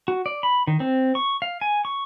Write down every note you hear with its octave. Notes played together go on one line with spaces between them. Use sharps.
F#4
D5
B5
D#3
C4
C#6
F5
G#5
C#6